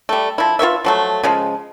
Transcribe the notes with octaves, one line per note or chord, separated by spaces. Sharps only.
G3 A3
F3 E4
F4 B4 C#5 E5
F3 F#3 A3
C#3 F3 G#3